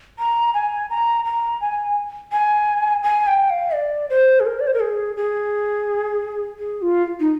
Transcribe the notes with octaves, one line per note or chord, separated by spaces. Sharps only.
A#5
G#5
A#5
A#5
G#5
G#5
G#5
G5
F5
D5
C5
G#4
A#4
D5
C5
A#4
G#4
G#4
G#4
F4
D#4